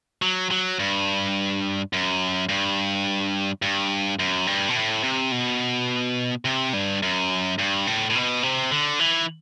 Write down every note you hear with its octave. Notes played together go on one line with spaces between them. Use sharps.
F#3
F#3
G2
F#2
G2
G2
F#2
G2
B2
A2
C3
B2
C3
G2
F#2
G2
A2
A2
B2
C3
D3
E3